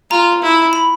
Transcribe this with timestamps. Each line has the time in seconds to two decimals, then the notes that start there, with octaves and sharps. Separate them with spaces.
0.10 F4 A#5
0.42 E4
0.73 B5